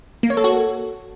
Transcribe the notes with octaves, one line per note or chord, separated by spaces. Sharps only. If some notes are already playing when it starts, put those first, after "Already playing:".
A#3
C#5
A4
F#4